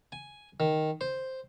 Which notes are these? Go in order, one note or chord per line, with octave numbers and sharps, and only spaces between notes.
G#5
D#3
C5